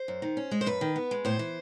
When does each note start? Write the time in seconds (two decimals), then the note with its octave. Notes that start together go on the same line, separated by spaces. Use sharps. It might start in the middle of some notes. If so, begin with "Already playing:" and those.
Already playing: C5
0.08 F#2
0.22 D#3
0.37 C#4
0.51 G#3
0.61 C5
0.66 F#2 B4
0.81 D#3
0.96 B3
1.11 G#3
1.25 A2 C5
1.39 E3